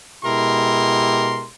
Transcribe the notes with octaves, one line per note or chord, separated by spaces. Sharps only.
B2 G#3 E4 G4 A#4 C6